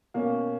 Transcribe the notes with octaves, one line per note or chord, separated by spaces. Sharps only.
B2 A#3 C#4